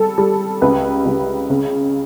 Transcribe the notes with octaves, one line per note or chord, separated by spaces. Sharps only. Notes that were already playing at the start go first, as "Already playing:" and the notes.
Already playing: G3 A4
G3
C#2 B4
C#2
C#3